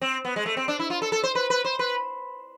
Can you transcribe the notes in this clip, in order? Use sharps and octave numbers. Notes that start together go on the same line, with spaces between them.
C4
B3
G#3
A3
C4
D4
E4
F4
A4
A4
C5
B4
B4
C5
B4